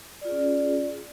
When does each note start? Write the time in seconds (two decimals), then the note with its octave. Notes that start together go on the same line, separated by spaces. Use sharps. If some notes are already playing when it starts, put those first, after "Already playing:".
0.21 D5
0.25 F4
0.28 G#4
0.32 C#4